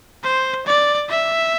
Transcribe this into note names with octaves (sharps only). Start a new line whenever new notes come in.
C5
D5
E5